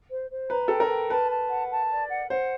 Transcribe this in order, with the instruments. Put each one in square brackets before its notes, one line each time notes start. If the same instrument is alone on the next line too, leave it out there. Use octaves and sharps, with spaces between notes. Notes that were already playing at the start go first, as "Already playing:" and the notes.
[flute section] C5
C5
[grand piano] B4 [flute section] A#5
[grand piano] A4 [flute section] G5
[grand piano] A#4
[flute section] G5
[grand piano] B4 [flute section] A5
[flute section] A5
F#5
A5
D5
F#5
[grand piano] C5 [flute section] F#5